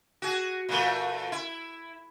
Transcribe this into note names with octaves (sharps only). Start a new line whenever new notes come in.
F#4 G#4
A#2 E3 A3
E4